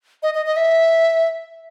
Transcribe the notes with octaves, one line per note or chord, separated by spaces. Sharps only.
D#5
D#5
D#5
E5